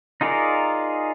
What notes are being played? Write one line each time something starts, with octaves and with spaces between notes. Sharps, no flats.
D#4 F4 G#4 A#4 D5